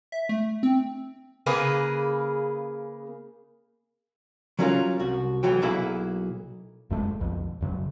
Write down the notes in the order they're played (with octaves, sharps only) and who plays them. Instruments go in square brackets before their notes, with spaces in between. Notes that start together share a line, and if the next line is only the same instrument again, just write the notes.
[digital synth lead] E5
A3
C4
[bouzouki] C#3 A#3 G#4 B4
[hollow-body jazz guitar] F#3 G3 C#4 E4 F4 A#4
C2 F#4
B1 E3 F#3 F#4 G5
B1 F#3 A#3 E4 G#4 B5
[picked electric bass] F1 F#2 G#3 A3
B1 F2
F1 F#2 C#3 F#3